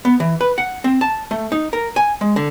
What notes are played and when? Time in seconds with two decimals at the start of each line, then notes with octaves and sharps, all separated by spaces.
0.05 B3
0.20 E3
0.41 B4
0.58 F#5
0.84 C4
1.01 A5
1.31 A3
1.52 D#4
1.73 A#4
1.96 G#5
2.21 G#3
2.36 D3